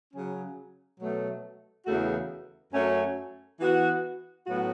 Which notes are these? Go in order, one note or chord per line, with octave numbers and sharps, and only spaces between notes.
C#3 F#3 C#4
B2 F#3 A3
E2 C#3 E3 A3 F#4
F#2 F#3 A3 C#4
E3 B3 F#4
A2 F#3 B3 F#4